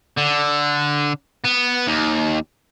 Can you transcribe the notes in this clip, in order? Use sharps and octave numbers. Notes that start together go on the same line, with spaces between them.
D3
B3
D#2